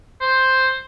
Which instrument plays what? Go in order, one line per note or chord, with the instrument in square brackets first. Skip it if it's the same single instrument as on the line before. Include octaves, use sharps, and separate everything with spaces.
[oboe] C5